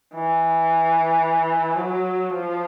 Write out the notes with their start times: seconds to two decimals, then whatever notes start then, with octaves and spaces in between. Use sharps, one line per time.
0.15 E3
1.76 F#3
2.30 F3